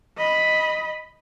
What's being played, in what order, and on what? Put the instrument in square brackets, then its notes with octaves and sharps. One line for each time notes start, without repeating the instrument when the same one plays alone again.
[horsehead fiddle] D#5 B5